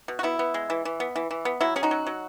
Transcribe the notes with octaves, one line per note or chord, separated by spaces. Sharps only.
B2
F#4
B3 E4
B3
G#3
E3
E3
B3
E3
E3
B3
F#3 E4
C#4 G#4
D#4 F#4
F#3
F#3